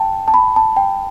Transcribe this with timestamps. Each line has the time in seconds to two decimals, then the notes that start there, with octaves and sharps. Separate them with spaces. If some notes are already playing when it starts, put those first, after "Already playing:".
Already playing: G5 A5
0.28 A5
0.34 B5
0.56 A5
0.77 G5